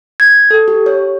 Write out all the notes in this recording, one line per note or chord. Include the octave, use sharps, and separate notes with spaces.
G#6
A4
G4
C#5